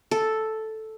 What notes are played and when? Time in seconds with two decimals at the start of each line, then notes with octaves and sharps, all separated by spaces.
0.11 A4